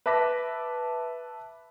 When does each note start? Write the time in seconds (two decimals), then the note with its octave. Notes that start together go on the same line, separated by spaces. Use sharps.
0.06 B4 E5 A5 D6 A#6 B6